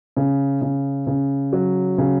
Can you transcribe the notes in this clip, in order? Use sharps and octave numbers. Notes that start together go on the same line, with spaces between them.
C#3
C#3
C#3
F#3
C#3